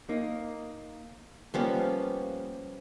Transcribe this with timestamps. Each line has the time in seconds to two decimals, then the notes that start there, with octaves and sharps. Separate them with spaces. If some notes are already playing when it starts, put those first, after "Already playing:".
0.09 A#3 D#4
1.54 F3 G3 A#3 B3 C#4 G4